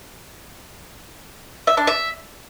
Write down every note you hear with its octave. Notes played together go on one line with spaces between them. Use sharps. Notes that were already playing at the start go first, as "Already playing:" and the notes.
E5
D4
E5